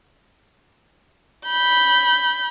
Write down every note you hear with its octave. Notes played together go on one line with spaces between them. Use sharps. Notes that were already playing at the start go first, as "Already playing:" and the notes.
B5 G6